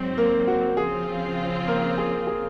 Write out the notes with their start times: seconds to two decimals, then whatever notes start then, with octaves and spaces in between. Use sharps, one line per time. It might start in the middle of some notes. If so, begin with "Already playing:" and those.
Already playing: G#2 F#3 C4
0.17 A#3 A#4
0.47 F#4
0.77 C#3 F3 C4 F4 G#4
1.68 A#3 A#4
1.98 G#4
2.27 G#4